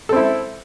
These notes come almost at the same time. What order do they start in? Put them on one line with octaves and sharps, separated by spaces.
A4 C4 E4